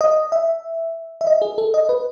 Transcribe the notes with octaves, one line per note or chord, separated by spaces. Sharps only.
D#5
E5
E5
D#5
G#4
A4
D#5
B4